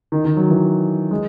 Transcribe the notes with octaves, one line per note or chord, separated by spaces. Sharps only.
D#3
D#3
F#3
E3
G#3